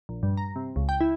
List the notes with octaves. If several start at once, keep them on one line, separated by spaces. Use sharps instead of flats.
A#1
G2
A#5
C3
C#2
G5
E4